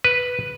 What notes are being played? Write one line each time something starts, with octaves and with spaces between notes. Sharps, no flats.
B4